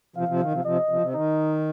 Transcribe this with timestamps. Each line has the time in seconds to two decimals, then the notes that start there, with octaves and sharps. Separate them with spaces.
0.16 C3 F3 F5
0.28 C3 F3
0.40 D#3
0.52 C3 F3
0.64 C3 F3 D#5
0.89 C3 F3
1.01 C3
1.14 D#3 D#4